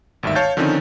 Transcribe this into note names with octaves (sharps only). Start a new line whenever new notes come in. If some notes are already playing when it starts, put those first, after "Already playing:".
G#1 D2 G2 D#3 E5
C#5 F5 A5 G6 A6
D3 D#3 F3 C4 C#4 D#4